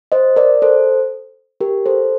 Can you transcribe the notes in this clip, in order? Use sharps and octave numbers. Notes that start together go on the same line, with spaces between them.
C5 D#5
A#4 D5
A4 C5
G4 A#4
A4 C5